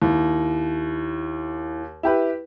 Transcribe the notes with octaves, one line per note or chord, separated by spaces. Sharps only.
D#2 E4
E4 G4 B4